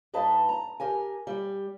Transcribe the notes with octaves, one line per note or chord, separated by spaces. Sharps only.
G2 D#4 B4 D#5 A5
A#5
G4 A#4 G#5
G3